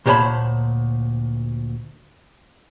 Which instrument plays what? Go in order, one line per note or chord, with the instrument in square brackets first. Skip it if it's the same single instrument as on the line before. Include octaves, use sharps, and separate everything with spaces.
[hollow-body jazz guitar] D2 A#2 C5 C#5 A5 B5